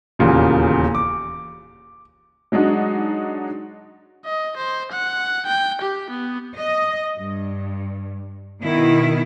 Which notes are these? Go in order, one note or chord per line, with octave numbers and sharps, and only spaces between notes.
D#1 E2 A#2 C#3
D6
F#3 G#3 D4 D#4 F#4
D#5
C5
F#5
G5
G4
B3
D#5
G2
B2 D#3 E4